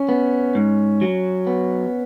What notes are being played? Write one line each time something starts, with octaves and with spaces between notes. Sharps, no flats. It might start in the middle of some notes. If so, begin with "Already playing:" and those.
Already playing: C#4
B3
G#2
F#3
B3